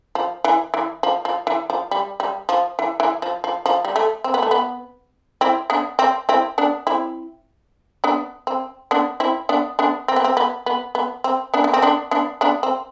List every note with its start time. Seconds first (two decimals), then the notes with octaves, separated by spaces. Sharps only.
0.15 F3
0.44 E3
0.74 E3
1.03 F3
1.25 F3
1.47 E3
1.70 F3
1.91 G3
2.20 G3
2.49 F3
2.79 E3
3.00 E3
3.22 F3
3.44 F3
3.66 F3
3.85 G3
3.96 A3
4.24 C4
4.34 B3
4.42 A3
4.51 B3
5.41 C4 E4
5.70 B3 D4
5.99 C4
6.29 C4 E4
6.58 B3 D4
6.87 C4 E4
8.04 B3 D4
8.47 C4
8.91 B3 D4
9.20 C4 E4
9.49 B3 D4
9.79 B3 D4
10.08 C4
10.16 B3
10.24 C4
10.37 B3
10.66 B3
10.95 B3
11.24 C4
11.54 B3 D4
11.64 B3
11.73 C4
11.82 B3 D4
12.11 B3 D4
12.41 B3 D4
12.63 C4